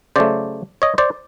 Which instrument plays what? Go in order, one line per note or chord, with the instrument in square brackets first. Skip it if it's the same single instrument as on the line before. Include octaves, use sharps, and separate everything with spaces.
[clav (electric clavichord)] C#3 F#3 A3 C5 D5
C#5 D#5
C5 D5